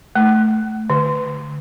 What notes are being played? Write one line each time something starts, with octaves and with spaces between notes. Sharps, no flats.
A3
D3